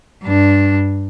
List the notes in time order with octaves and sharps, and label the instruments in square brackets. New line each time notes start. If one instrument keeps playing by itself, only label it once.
[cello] G2 D4